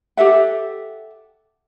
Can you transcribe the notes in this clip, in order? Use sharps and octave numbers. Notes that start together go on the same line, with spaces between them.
G4 A4 E5 F#5